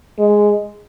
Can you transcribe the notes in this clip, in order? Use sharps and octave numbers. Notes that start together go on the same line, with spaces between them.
G#3